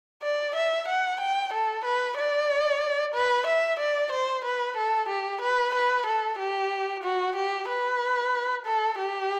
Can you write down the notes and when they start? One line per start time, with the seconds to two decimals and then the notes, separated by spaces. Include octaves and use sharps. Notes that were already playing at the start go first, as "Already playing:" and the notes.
0.23 D5
0.56 E5
0.88 F#5
1.21 G5
1.53 A4
1.85 B4
2.18 D5
3.15 B4
3.47 E5
3.80 D5
4.12 C5
4.45 B4
4.77 A4
5.09 G4
5.41 B4
5.74 B4
6.07 A4
6.39 G4
7.04 F#4
7.36 G4
7.69 B4
8.66 A4
8.98 G4